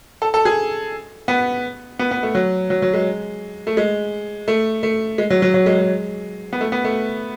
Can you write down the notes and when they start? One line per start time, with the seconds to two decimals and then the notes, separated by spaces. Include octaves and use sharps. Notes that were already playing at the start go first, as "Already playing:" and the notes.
0.22 A4
0.34 A4
0.45 G#4
1.28 B3
1.99 B3
2.11 B3
2.23 A3
2.35 F#3
2.70 F#3
2.82 F#3
2.94 G#3
3.67 A3
3.77 G#3
4.48 A3
4.83 A3
5.18 G#3
5.30 F#3
5.42 F#3
5.54 F#3
5.66 G#3
5.78 G#3
6.53 B3
6.61 A3
6.72 B3
6.84 A3